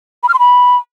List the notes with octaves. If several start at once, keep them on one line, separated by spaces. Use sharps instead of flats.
B5
F6
C6
B5